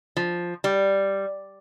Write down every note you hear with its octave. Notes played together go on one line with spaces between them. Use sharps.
F3
G3